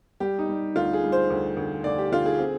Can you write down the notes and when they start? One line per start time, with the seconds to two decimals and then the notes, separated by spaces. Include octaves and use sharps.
0.20 G3 G4
0.39 D#4
0.49 G3
0.76 D2 F4
0.93 G#4
1.03 G3
1.12 C5
1.30 D2
1.57 D2
1.84 D2 D5
1.98 G4
2.12 D3 F4
2.26 G#4
2.39 C4